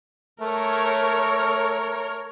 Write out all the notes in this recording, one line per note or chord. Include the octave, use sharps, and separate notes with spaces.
A3 A#4 C#5